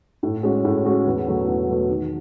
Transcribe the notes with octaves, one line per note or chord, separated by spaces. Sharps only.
A2
G#3 C#4 F#4
A2
G#3 C#4 F#4
E2
B2 F#3 A3
E2
B2 F#3 A3
D#3